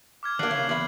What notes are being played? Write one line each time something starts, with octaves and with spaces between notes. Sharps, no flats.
D6 F6 G#6
D3 A#3 F#6 C7 F#7
C#3
E2 B5 F#7